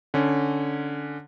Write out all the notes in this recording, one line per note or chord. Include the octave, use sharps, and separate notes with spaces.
D3 C#4